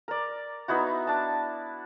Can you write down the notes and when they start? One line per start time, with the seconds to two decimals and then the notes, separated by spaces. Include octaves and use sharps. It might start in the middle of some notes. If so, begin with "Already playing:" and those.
0.08 A#4 D5
0.68 B3 D#4 E4 F#4
1.07 D4 A5